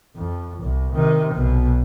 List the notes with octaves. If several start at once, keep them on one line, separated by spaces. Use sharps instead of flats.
F2
C2
C3 D#3
B1 B2